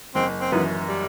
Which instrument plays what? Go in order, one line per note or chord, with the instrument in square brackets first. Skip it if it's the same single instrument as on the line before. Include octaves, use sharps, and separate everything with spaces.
[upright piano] F#1 [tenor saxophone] C4
[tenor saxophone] C4
[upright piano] F#2 E3 [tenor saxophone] B3
[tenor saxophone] G3